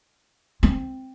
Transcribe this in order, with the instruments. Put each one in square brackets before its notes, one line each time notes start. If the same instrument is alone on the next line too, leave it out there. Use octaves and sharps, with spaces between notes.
[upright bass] C4